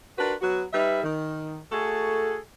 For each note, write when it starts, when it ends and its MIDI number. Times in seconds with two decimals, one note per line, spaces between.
0.17 0.33 62
0.17 0.33 65
0.17 0.33 66
0.17 0.33 70
0.17 0.33 71
0.41 0.62 54
0.41 0.62 59
0.41 0.62 66
0.73 1.00 55
0.73 1.00 63
0.73 1.00 71
0.73 1.00 76
1.02 1.57 51
1.71 2.37 57
1.71 2.37 66
1.71 2.37 68
1.71 2.37 69